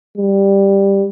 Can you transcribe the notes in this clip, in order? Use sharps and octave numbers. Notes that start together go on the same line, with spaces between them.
G3